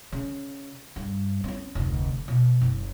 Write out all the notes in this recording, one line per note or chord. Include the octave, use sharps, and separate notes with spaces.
C#3
G2
C4 C#4
F1 D2
B2
F#1